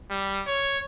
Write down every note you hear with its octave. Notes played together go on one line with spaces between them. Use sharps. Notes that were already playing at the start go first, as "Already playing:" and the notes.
G3
C#5